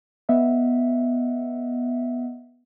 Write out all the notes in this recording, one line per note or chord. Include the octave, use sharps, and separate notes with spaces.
B3 D#5 E5 F#5